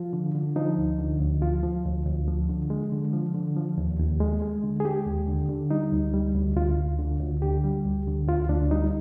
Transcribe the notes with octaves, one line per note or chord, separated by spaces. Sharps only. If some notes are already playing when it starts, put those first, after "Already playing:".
Already playing: F3 F4
D3
D3
F3 D#4
D2
D3
D2
F3 F4
F3
D2
D2
F3
D3
G#3
D3
F3
D3
F3
D#2
D#2
G#3
G#3
D3
G#4
G#3 G4
D#2
D3
D3
G3 D#4
D2
G3
D2
D2 F4
D2
D3
D2
D3 G4
G3
D2
D3
D2 F4
D2 D4
G3 D#4